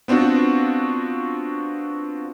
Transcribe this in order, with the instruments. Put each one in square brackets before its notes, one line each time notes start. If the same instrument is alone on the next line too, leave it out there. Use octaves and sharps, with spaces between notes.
[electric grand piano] B3 C4 D4 F4 F#4